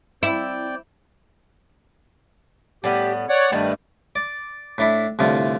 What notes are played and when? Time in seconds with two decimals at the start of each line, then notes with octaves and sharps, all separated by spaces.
0.23 C4 E4 D5 G5
2.84 A2 G3 B3 G4
3.29 C#5 D5 F#5
3.52 G2 D#3 G3 A3 B3
4.16 D5
4.78 A2 D4 E4
5.19 C2 A2 D3 F4